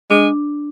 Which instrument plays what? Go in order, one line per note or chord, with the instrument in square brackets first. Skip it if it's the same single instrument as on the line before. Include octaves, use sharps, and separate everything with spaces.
[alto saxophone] G#3 [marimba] D4